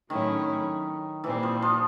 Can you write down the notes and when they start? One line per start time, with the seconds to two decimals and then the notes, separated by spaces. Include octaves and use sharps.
0.09 A2 D#3 F#3 A3 C#4 E4
1.24 A#2 E3 G3 C4
1.43 F3
1.62 F3